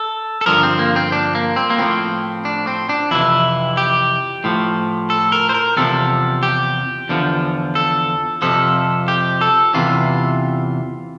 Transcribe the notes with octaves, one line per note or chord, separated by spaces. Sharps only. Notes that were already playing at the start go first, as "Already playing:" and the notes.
Already playing: A4
A4
G2 D3 F3 A#4
C4
A#3
C4
D4
A#3
C4
A#3
A2 F3 C4
D4
C4
D4
F2 C3 E3 E4
G4
A2 F3
A4
A#4
C5
A#4
E2 C3 F3 A4
G4
E2 D3 F3
A4
F2 C3 F3 A4
G4
A4
E2 C3 E3 F4